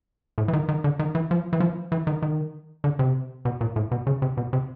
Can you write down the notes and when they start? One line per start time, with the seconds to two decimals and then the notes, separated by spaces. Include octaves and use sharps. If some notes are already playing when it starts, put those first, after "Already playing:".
0.38 A2
0.48 E3
0.53 D#3
0.69 D#3
0.84 D3
0.99 D#3
1.15 E3
1.31 F3
1.53 E3
1.60 F3
1.92 E3
2.07 D#3
2.22 D#3
2.84 D3
2.99 C3
3.45 B2
3.61 A#2
3.76 A2
3.92 B2
4.07 C#3
4.22 C3
4.37 B2
4.53 C3